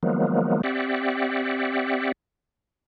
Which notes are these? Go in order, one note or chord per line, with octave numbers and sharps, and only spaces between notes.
D#3 F3 F#3 G#3 A#3 B3
C4 G4 D5 E5 F#5